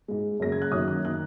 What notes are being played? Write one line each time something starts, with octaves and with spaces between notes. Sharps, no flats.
G#2 G#3
F#2 C#3 A#3 A#6
G#6
F#6
F#2 D#3 F#3 A#3 D#6
F#6
D#3 A#3 F#6